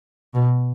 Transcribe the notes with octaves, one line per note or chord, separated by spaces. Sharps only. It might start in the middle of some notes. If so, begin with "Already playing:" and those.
B2